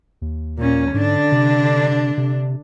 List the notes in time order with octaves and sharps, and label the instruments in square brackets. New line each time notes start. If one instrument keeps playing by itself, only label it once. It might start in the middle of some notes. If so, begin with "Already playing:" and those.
[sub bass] D#2
[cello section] A#2 C#4
[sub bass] G#2 [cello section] D3 D4
[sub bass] C3
C3